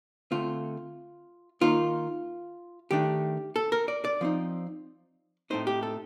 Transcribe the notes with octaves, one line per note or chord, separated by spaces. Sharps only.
D3 A3 C4 F4
D#3 A#3 D#4 F4
D#3 A3 D4 G4
A4
A#4
D5
D5
F3 C4 D#4
A2 A3 C4 D#4 C5
G4
A4